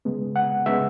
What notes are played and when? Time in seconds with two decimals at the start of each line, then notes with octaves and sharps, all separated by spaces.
0.05 C#3 G#3 B3
0.36 F#5
0.66 C#3 G#3 B3 E5